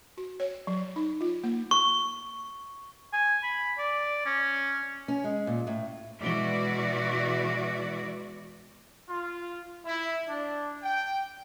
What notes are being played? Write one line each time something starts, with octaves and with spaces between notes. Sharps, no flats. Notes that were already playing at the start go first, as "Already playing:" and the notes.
F#4
C#5
F#3
D#4
F4
A#3
C#6
G#5
B5
D5
C#4
C#4
G#3
A#2
A2
B2 E3 G#3 E4 F#4 D5
F4
E4
D4
G5